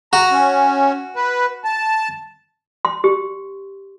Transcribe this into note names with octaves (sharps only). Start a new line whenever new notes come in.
F#4 A#5
C#4
B4
A5
C6
G4